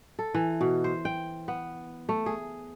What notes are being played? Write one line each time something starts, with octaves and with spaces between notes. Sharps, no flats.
A4
E3
B2
C5
G5
B3
A3
G#4